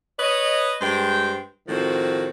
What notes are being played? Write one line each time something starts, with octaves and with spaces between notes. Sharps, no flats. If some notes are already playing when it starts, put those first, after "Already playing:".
B4 C#5 D#5
G2 G#3 C5 G5
A2 D#3 F3 C4 F#4